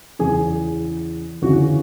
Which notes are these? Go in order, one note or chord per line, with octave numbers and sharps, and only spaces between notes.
E2 C#3 E3 G#4
D2 C#3 E3 F#4